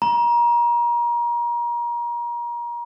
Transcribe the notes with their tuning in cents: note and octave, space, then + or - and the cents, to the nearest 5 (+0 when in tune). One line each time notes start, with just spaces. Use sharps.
A#5 +30